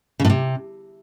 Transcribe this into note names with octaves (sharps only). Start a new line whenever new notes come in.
C#3
A2
C3